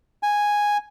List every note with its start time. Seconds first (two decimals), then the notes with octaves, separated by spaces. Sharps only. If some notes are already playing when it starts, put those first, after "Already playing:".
0.23 G#5